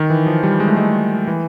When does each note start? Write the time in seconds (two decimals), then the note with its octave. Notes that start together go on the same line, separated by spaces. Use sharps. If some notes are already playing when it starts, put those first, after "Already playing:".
Already playing: D#3
0.10 E3
0.26 F3
0.43 G3
0.60 G#3
0.68 A3
0.77 G#3
1.27 E3